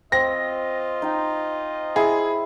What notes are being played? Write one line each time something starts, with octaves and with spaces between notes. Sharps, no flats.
C4 F4 D#5 A#6
D#4 G5
E4 G#4